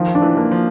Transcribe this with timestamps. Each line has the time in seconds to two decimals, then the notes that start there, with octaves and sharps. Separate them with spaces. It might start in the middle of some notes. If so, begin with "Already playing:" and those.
Already playing: D#3 F3
0.15 D4
0.22 E3
0.37 A#3
0.52 F3